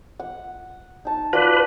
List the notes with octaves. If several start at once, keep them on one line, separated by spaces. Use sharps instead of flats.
F#5
D#4 A5
F4 F#4 B4 D5